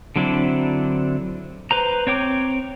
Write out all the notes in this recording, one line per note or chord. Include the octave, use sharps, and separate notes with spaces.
D3 F#3 C4 D4 E4
B4 C5 A#5
C4 C#5 G5 D6